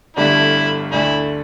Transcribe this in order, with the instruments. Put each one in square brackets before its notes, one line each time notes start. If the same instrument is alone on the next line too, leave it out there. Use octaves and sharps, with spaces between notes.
[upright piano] G1 G2 D3 A3 D4 [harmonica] E4
[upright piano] D2 D3 A3 D4 [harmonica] E4